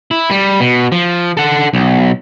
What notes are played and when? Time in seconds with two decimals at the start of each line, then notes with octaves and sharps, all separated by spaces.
0.11 E4
0.31 G3
0.60 B2
0.92 F3
1.37 A4 F#5
1.74 B1